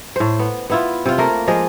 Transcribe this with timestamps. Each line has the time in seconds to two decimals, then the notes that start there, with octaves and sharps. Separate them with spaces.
0.16 A2 C5
0.39 B3
0.70 B3 E4 F4
1.06 C3 F4
1.18 A3 A#3 A#4
1.48 F3 G#3 D#5